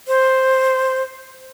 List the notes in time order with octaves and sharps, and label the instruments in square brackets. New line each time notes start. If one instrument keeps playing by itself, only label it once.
[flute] C5